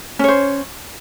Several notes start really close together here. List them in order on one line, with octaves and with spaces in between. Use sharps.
C#4 C#5 C5